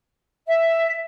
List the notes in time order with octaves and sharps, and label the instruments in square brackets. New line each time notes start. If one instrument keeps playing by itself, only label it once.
[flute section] E5